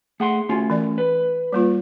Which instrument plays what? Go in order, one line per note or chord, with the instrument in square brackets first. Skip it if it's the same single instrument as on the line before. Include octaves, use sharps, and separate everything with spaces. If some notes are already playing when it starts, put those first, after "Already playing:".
[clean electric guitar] A3 F#5 C6 [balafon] G#4
[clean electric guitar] A3 C#4 F4 [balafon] F#4
[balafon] E3 D5
[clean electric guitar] B4
[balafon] G3 A#3 F4